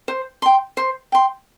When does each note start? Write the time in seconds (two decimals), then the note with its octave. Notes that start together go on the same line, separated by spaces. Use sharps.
0.08 C5
0.42 G5 C6
0.77 C5
1.12 G5 C6